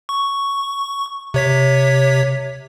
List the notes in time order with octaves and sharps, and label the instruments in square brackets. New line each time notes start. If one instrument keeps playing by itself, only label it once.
[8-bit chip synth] C#6
C3 C#5 B6